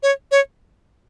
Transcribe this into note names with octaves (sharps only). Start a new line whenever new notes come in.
C#5
C#5